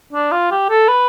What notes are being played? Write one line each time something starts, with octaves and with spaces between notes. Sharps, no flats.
D4
F4
G4
A4
B4